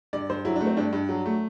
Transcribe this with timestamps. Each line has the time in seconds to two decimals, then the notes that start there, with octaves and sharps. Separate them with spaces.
0.13 G2 D5
0.30 G2 C5
0.45 F#3 E4
0.56 D4
0.61 A3
0.67 C4
0.77 G2 D4
0.93 G2
1.09 F#3
1.26 A3